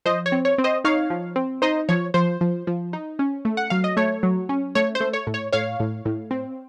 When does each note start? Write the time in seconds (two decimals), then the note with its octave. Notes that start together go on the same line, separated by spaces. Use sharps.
0.06 F3 C5 D#5
0.26 C#5
0.32 C4
0.45 C#5
0.58 C4
0.64 C5 D#5
0.84 D#4 C#5 F5
1.10 F3
1.36 C4
1.62 D#4 C5 D#5
1.89 F3 C#5
2.14 F3 C5
2.41 F3
2.67 F3
2.93 D#4
3.19 C#4
3.45 A3
3.57 F#5
3.70 F#3 F5
3.84 D#5
3.97 A3 C#5
4.23 F#3
4.49 C#4
4.75 A3 C#5
4.95 C5
5.00 A3
5.13 C#5
5.27 A2
5.34 C#5
5.52 A2 C#5 F5
5.80 A2
6.05 A2
6.31 C4